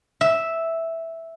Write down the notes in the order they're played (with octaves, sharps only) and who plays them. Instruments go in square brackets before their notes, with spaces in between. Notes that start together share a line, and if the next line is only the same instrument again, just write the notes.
[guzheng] E5